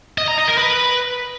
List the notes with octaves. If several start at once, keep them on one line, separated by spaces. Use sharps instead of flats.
D#5
A#5
D#5
A#4
B4